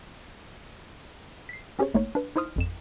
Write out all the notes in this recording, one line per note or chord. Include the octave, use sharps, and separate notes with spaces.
B6 C7
C4 C#4 G4 G#4 C5 C#5
G#1 A3 A#3 D#4 C#5
D4 B4
D#4 E4 C5 C6 D#6 F6
G#1 F2 E7